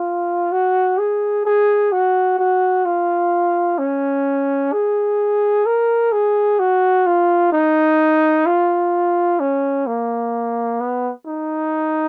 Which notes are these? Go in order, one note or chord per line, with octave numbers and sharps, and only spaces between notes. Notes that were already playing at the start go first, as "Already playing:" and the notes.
Already playing: F4
F#4
G#4
G#4
F#4
F#4
F4
C#4
G#4
A#4
G#4
F#4
F4
D#4
F4
C#4
A#3
B3
D#4